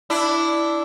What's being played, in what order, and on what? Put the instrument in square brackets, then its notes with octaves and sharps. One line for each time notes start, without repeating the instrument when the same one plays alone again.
[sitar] D4 E4